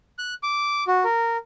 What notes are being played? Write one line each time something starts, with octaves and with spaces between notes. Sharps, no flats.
F#6
D6
F#4
A#4